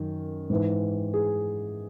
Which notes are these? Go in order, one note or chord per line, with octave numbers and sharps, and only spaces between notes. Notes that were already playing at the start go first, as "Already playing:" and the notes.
Already playing: F#2 D#3
G#2 E3
G#4